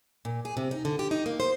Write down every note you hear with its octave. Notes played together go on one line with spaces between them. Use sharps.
A#2
G#4
C3
D#4
D3
G4
D#4
A#3
C5